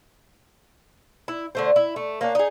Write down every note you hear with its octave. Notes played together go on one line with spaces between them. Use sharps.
E4
D3 A3 C5
E4
A3
A#3 C#4 D4
D#4 G#4